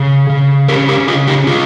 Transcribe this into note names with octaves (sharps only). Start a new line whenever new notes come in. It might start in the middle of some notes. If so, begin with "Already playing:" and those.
Already playing: C#3
C#3
C#4 G4 A#4
G4 A#4
C#3 F4 G#4
D#4 G4
C#3 F4 G#4